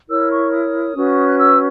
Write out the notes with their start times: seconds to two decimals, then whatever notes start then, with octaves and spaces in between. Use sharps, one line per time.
0.09 E4 A#4 C#5 E6
0.31 C#6
0.53 D#6
0.96 C#4 F#4 B4
1.27 F#6
1.39 E6